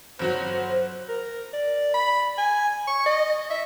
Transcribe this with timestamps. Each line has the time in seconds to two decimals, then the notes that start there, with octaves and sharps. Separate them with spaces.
0.19 G1 F#3 F#4 C5
1.08 A#4
1.53 D5
1.94 B5
2.38 G#5
2.87 C#6
3.06 D#5
3.50 E5